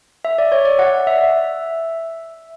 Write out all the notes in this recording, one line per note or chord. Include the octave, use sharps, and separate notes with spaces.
E5
D5
C#5
D5
F#5
E5